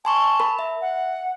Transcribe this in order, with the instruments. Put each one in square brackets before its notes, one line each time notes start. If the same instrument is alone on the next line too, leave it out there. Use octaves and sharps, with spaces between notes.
[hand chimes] G#5 C6 C#6 [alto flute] A5
[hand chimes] A#4 B5
E5
[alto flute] F#5